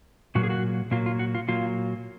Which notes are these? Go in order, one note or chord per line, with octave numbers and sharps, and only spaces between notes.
A#2 F#3 A#3 F#4
G#4
F#4
A#2 F#3 A#3 F4
F4
F#4
F4
A#2 F#3 A#3 F4